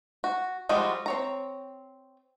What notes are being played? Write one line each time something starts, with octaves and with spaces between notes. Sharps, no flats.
F#4
F3 G3 G#3 D#4 F#4
C4 C#5 A#5